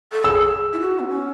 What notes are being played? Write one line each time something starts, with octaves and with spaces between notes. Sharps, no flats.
A4
G#4 E6
E4
F#4
B3
C#4